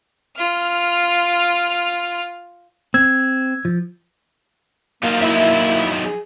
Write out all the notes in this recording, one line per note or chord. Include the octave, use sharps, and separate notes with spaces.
F4 F6
C4 E6 G#6
F3
F#3 A#3 D#4 F4 F5
E4 E5 B5
G#4